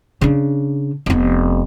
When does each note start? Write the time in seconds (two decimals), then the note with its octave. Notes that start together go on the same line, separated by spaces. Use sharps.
0.21 C#3 D4
1.06 F1 B3